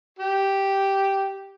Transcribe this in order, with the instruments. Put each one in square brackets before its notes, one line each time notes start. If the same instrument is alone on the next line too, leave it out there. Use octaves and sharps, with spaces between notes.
[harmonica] G4